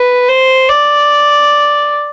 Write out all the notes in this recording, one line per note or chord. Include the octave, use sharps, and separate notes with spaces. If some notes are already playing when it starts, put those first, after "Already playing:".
Already playing: B4
C5
D5